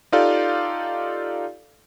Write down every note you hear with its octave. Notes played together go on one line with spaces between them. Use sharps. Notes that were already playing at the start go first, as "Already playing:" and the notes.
D#4 F4 G4 A4 D5 F5